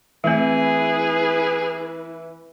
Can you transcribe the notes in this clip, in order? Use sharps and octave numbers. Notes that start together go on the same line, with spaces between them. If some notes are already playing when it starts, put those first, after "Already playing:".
E3 A3 C4 E4 G#4 B4